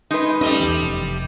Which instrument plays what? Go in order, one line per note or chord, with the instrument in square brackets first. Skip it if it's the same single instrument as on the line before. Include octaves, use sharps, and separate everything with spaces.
[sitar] G#3 [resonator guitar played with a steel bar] D#4 B4
[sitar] G3 A3 D#5 [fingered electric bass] C#4
[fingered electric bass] E2 E3
F1